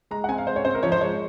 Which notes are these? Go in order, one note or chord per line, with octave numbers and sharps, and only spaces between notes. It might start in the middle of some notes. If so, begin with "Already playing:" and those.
G#3 A#5
F#5
C4 G#5
F5
G#3 C5
C#5
C4 C5
A#4
F3 C#5
C5
G#3 C#5